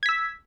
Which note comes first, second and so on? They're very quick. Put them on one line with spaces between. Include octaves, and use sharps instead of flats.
G#6 B6 E6